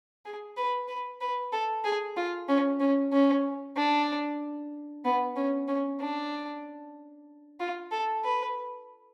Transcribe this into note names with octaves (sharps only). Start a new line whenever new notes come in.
G#4
B4
B4
B4
A4
G#4
F4
C#4
C#4
C#4
D4
B3
C#4
C#4
D4
F4
A4
B4